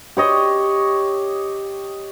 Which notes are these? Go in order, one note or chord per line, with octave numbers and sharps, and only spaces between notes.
G4 C#5 D#5